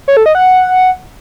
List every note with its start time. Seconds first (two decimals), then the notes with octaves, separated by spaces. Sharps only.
0.08 C#5
0.17 A4
0.26 D#5
0.35 F#5